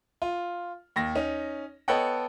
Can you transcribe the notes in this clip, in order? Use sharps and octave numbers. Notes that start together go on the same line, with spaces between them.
F4
D#2 A#6
C#4 D#4
B3 A4 C#5 D#5 F#5 G5